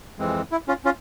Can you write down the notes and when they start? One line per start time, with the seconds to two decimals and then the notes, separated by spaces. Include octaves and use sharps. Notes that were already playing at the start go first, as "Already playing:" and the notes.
0.19 F2 E3 G#3 C4
0.51 E4
0.68 C#4 F4
0.85 C#4 F4